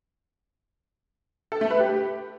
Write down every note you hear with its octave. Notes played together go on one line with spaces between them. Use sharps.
A4
A3
B4
G4